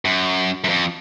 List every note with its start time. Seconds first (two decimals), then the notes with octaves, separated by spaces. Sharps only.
0.05 F#2
0.64 F#2
0.69 F2